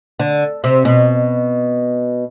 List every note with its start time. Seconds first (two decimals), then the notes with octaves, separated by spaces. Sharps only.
0.20 D3
0.64 C3
0.85 B2